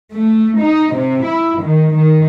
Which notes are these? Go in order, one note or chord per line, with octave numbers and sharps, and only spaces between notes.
A3
D#4
C3
E4
D#3
D#3